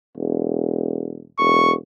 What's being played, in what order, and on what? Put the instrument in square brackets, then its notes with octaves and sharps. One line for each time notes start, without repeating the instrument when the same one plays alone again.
[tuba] E1
[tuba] E1 [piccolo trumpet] C#6